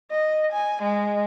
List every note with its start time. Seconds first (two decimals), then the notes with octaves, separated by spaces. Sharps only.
0.11 D#5
0.52 G#5
0.82 G#3